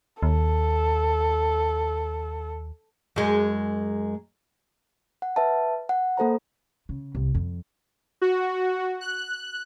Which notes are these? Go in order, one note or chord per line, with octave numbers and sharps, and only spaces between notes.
D#2 A4
F#2 G#3
F#5
B4 E5 A5
F#5
A#3 A4 C5 A#5
C#3
C2
F2
F#4
F#6